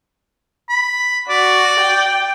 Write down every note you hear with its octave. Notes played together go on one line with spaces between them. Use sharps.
B5
F#4 D5
G5